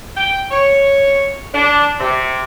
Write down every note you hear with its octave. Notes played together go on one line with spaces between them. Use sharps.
G5
C#5
D4
C3